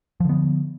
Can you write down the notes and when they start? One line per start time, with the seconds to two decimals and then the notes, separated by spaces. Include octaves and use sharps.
0.20 F3
0.25 D3
0.29 B3